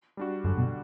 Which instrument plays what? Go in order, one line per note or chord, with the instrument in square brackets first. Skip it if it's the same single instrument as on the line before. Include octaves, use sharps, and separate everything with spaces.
[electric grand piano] G3 D4 F#4
[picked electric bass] F#2 [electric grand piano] D3
[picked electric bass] B2